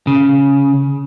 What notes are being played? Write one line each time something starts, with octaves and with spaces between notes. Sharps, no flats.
C#3